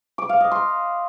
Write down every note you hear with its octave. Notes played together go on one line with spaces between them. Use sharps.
D6
F5
D#5
C6